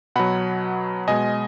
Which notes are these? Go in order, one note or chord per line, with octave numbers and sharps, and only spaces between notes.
B2 F#3 F#5 B5
B2 G#3 D#5 G#5